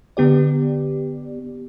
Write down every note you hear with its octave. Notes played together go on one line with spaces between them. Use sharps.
D3 B3 G4 D5